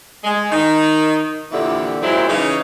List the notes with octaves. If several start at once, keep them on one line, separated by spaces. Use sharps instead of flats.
G#3
D#3 D#4
F2 A#2 D3 E3 E4 G4
A#2 F#3 G#3 C4 C#4 E4
C#3 E3 D#4